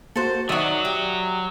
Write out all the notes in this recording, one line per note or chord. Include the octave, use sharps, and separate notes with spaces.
A#3 F#4 A4 C5
D#3 F#3 D4 F#4 D5 E5 D#6
G4